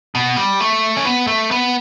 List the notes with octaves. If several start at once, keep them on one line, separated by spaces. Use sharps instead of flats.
B2
G3
A3
C#4
B3
A3
B3